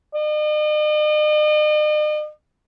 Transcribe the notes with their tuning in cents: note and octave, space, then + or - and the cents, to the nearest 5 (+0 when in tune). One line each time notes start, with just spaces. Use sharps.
D#5 -45